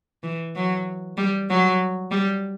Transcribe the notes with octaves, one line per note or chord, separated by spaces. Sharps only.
E3
F#3
G3
F#3
G3